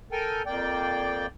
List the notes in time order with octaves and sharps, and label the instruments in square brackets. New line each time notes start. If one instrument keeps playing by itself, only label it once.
[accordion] A4 A#4 G5 G#5
F2 A#3 D5 G5